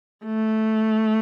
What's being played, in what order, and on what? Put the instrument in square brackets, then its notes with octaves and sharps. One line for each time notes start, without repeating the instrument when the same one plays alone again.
[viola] A3